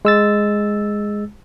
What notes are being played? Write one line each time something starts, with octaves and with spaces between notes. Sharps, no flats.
G#3 E6 A6